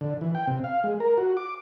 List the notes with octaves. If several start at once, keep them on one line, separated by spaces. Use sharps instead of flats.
D3
E3
G5
C3
F5
G#3
A#4
F#4
D6